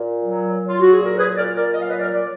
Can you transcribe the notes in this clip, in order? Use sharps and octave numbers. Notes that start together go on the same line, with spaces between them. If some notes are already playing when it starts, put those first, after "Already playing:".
Already playing: A#2
F#3
F#3
F4
F#4
G#4
A#2
A#4
G#4 B4
A#2 A#4 D5
A#4 D5
F#3 D#5
F5
B4 D#5
A#4 D5
F#3 D5